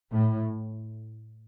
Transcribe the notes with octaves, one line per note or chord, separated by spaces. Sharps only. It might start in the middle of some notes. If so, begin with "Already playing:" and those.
A2